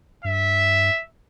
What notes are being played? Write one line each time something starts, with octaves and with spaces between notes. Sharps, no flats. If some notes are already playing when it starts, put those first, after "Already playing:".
G2 E5